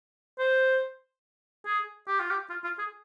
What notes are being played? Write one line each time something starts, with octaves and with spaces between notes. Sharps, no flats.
C5
G#4
G4
F4
G4
F4
F4
G#4